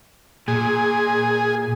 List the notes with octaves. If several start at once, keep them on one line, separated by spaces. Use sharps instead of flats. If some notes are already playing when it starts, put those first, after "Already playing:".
A#2 G#4